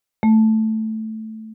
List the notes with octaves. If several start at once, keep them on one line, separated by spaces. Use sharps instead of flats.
A3